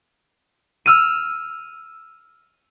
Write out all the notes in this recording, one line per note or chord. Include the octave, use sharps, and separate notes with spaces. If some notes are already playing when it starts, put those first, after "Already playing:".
E6 F6 D#7